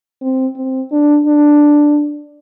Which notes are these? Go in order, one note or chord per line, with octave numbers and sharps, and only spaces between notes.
C4
C4
D4
D4